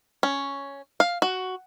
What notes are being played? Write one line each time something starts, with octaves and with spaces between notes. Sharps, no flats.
C#4
F5
F#4